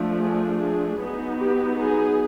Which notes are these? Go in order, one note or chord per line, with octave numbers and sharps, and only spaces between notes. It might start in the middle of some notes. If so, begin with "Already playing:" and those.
Already playing: F3 A3 D4
G#4
G#4
F#3 B3 D#4
G4
G#4